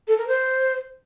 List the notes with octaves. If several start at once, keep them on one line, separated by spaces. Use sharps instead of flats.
A4
A#4
C5